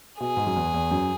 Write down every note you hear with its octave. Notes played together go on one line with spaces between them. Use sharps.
B2 G#4
G#2
F#2
E2
E2
F#2